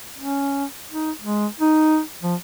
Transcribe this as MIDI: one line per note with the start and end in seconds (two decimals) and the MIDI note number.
0.18 0.65 61
0.91 1.11 63
1.22 1.47 56
1.60 2.00 63
2.23 2.35 53